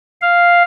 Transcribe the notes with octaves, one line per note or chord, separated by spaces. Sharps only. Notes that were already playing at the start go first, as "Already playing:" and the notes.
F5